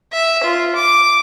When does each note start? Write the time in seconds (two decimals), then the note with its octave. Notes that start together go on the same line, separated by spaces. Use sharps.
0.13 E5
0.44 F4
0.75 D6